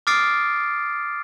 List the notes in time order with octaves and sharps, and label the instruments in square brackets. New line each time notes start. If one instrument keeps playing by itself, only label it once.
[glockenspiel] D6 D#6 F6 A6 C7 D7